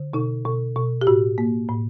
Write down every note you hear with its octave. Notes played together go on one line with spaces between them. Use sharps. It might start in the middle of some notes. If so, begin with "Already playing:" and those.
Already playing: D3
B2 D#4
B2
B2
G4
A2 F#4
A#3
A2